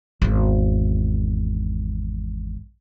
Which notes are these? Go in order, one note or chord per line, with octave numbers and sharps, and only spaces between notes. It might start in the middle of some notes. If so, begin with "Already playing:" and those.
G#1 E2